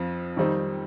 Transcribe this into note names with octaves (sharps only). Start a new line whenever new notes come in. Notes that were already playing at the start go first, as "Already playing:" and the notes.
Already playing: F2 F3
F2 D#3 G3 C4 D#4